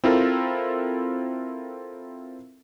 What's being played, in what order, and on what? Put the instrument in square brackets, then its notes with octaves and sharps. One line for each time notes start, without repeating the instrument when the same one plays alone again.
[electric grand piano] C4 E4 F4 A4 A#4